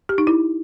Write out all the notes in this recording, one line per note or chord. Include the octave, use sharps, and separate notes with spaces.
G4
D#4
E4